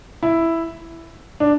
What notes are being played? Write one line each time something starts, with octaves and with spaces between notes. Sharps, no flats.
E4
D4